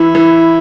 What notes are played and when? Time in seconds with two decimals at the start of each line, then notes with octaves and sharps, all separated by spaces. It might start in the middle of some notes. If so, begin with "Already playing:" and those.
Already playing: E3 E4
0.15 E3